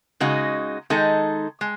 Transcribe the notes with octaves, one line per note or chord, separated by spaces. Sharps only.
C#3 G#3 D#4 F#4
D#3 G#3 D#4 A4
G#3